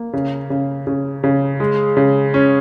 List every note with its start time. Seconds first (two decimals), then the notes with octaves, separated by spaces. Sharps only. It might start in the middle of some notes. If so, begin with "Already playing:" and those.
Already playing: A#3
0.13 C#3
0.50 C#3
0.87 C#3
1.24 C#3
1.60 G#3
1.97 C#3
2.34 C#4